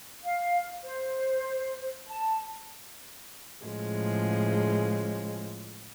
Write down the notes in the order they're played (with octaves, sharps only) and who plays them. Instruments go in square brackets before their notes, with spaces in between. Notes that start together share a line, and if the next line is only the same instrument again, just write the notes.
[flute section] F5
C5
A5
[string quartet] A2 C#3 F3 G#3